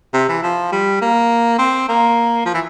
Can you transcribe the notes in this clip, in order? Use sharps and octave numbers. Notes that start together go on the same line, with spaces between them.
C3
E3
F3
G3
A#3
C4
A#3
F3
E3